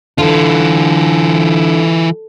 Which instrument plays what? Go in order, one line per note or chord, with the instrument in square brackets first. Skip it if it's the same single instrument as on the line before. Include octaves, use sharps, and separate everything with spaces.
[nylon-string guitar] D3 [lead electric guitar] E3 F4